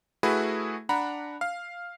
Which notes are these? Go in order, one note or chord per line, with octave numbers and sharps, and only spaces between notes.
A3 E4 F#4 G#4 B4
D4 F#5 A#5 B5
F5